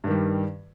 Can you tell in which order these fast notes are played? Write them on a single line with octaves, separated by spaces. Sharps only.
G2 D#3 G3